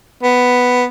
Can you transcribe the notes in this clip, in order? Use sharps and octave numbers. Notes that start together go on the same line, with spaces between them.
B3